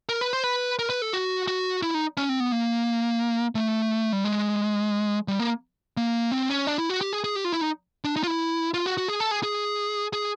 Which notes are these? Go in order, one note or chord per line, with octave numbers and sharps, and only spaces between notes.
A#4
B4
C5
B4
A#4
B4
A4
F#4
F#4
E4
D#4
C#4
C4
B3
A#3
A3
G3
G#3
G3
A#3
A#3
C4
C#4
D4
E4
F#4
G4
G#4
G#4
G4
F4
E4
D#4
D4
D#4
F4
E4
F4
F#4
F#4
G#4
A4
G#4
G#4
G#4